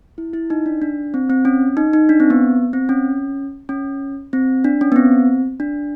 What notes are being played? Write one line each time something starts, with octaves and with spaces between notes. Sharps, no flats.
E4
E4
D#4
D4
D4
C4
C4
C#4
D#4
D#4
D4
C4
B3
C4
C#4
C#4
C4
D4
C#4
B3
C4
D4